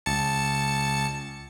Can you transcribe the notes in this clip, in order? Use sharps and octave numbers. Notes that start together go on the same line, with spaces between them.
C#2 A5 C#7